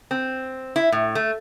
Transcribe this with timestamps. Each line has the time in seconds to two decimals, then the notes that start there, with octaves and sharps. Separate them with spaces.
0.11 C4
0.76 E4
0.92 A2
1.15 A3